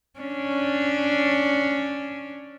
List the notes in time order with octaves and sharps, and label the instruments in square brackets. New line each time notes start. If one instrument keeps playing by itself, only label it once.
[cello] C#4 D4